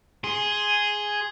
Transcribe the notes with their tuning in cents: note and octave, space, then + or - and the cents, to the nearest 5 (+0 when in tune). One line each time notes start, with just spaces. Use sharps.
G#4 +0 C6 +10